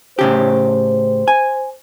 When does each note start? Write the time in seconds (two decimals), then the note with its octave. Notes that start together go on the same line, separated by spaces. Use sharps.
0.19 A2 C#3 G4 C5
1.28 G#5